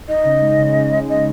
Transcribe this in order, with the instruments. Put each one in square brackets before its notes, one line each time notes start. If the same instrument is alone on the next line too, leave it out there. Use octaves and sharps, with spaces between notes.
[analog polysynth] D#4 [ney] D#5
[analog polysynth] C#3
G#3
C#3
C#3
G#3
[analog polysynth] C#3 [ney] D#5